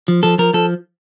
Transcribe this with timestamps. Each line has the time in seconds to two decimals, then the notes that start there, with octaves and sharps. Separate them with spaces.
0.08 F3
0.23 F3 A4
0.38 F3 A#4
0.54 F3 A4